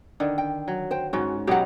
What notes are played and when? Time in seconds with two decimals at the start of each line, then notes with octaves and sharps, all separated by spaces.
0.20 D3 D#3
0.38 G5
0.68 F#3
0.91 C5 G5
1.13 G#2 C#4 F#4
1.47 B2 F#3 D#4 G4 F#5